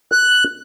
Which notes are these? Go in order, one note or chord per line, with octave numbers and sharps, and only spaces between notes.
F#6